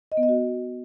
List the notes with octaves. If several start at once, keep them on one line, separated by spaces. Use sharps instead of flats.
D#5
B3
D#5
F#4